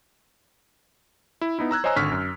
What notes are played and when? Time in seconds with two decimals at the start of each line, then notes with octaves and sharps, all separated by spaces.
1.41 E4
1.59 B3 D#4 E4
1.71 A#5 E6 F#6 G#6
1.84 C5 C#5 D#5 G#5 A#5 E6
1.96 G#1 D3 C#6 F6 B6
2.12 F#2